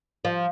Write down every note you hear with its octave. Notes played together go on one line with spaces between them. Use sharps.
F3